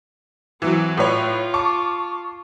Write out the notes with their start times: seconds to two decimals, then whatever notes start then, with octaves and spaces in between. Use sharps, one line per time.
0.62 E3 F#3 C4
0.97 A2 F4 B4 C#5
1.54 A5 C#6 D6